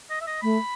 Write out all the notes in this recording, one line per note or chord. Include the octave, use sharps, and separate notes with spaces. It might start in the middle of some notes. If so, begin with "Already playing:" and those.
D#5
E5
D#5
A3 B5